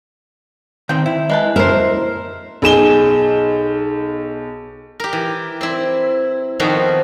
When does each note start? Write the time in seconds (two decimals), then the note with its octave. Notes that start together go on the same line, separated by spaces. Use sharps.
0.89 D#3 C4 C5 G5
1.06 E4
1.30 G#3 B4 A5
1.56 E4 A#4 C5
2.62 B1 G#4 E7 G7
5.00 G4 A#4
5.13 E3
5.61 C4 E4
6.60 F2 D#3 B3 C4 F#4 F5